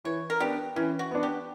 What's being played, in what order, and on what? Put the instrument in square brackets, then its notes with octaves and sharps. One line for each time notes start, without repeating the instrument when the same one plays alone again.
[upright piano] E3 [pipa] C#5
[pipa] A#4
[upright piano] B3 D4 [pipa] G4
[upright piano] E3 [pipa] C#4
[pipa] F#4
[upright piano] B3 D4
[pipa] G4